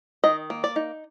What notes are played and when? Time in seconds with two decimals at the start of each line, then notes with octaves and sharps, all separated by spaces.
0.24 D#3 D#5
0.50 A#3
0.64 D5
0.76 D#4